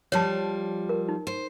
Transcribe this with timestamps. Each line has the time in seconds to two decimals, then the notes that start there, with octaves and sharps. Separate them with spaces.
0.12 F3 G3 C#5 A5
0.89 A#4
1.09 D#4
1.27 C5